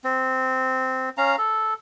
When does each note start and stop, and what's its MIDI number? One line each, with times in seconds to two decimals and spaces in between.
0.04 1.09 60
1.18 1.36 61
1.18 1.36 77
1.18 1.36 82
1.38 1.74 69